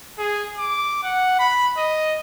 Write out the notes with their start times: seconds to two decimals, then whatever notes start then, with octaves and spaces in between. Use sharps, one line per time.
0.18 G#4
0.58 D6
1.04 F#5
1.39 B5
1.78 D#5